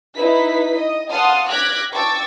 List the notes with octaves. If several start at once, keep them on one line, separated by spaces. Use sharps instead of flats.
D#4 E4 B4 B6
D#5
F5 F#5 A5 C6 D#6 F6
D6 F6 F#6 G#6 A#6 B6
G5 A5 C#6 D6 E6 A6